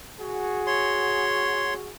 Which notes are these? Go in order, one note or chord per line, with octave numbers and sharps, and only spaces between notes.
F#4 G#4
C#5 C6